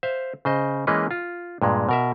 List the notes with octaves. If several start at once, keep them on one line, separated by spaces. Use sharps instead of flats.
C5 E5 F5
C#3 C5 D#5
E3 G#3 A#3 C#4 B4 D#5
F4
G2 A#2 G#3
B2 A#4 E5